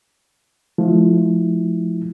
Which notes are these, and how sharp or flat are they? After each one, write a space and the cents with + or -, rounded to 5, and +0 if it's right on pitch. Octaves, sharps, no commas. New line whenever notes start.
F3 +0 A3 -40 E4 -20